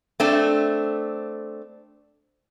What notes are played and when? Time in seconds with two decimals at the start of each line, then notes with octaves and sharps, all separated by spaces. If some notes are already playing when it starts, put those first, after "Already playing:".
0.20 A3 C4 D4